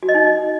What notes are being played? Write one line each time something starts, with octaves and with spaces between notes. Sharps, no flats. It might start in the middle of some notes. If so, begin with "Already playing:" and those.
F#4
D#5
D#4